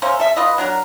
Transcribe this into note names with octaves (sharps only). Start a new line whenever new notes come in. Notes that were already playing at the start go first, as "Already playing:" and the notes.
A#3 C#4 C5 E5
A4 E5
F4 B4 D#5
F#3 D4 A#4